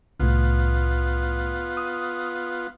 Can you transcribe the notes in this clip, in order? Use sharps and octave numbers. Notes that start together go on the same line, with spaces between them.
C2 A2 B3 F4
D#6